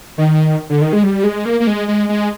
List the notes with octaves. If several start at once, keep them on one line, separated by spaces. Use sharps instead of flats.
D#3
D3
D#3
G#3
G3
G#3
A#3
A#3
G#3
G#3
G#3